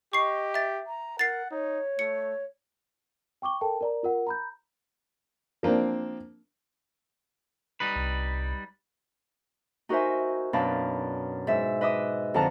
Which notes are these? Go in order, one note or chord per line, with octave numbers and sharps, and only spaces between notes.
G4 D#5 C#6 C7
E5 A6
A#5
A#4 F#5 A6 C7
D#4 C#5
A3 C#7
G5 C#6 D6 G7
A4 A#4 G5 A5
A#4 D5 A#5
F4 A#4 F#5
A#5 B5 G6
F3 A#3 C4 D4
G3 D#4 B4
C2
D#4 F#4 A#4 C5 E5 G#5
F#2 B2 D4 F5 A5 B5
G#2 E5
B4 D#5 E5 D6 D#6
F2 D3 F3 F#5 A5 A#5